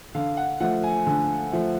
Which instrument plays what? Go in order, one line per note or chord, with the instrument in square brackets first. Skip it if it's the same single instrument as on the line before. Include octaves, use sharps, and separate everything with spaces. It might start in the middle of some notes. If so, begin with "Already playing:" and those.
[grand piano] D3 F5
F#5
F3 A3 F#5
G#5
D3 G#5
F3 A3